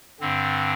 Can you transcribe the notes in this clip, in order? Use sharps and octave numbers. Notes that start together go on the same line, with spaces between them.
G2 D3 C4